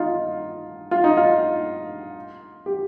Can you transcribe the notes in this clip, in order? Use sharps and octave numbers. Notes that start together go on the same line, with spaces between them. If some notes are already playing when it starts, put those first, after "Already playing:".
Already playing: D#4 F4
F4
D#4
F4
G4